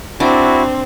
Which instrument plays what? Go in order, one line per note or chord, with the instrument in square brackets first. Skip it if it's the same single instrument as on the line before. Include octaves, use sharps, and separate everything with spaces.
[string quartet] C4 [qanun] D4 [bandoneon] E4 F#4